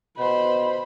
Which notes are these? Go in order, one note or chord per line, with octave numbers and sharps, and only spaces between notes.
B2 C5 B5